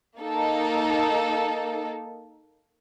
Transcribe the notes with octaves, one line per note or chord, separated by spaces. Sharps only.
A#3 D#4 A4